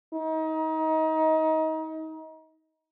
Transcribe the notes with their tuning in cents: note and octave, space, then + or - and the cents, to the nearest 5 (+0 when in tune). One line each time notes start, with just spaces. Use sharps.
D#4 +30